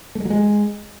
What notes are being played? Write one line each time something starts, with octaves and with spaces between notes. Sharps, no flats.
A3
G#3
F#3
G#3